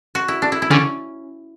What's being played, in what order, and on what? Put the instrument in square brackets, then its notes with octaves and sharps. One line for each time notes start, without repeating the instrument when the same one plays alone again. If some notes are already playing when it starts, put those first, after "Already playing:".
[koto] F#4
E4
D4
E4
E4
[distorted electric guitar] D3 [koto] C#4